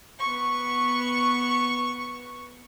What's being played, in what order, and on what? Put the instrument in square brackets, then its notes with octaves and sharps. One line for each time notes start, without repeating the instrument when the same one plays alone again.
[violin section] B3 C#6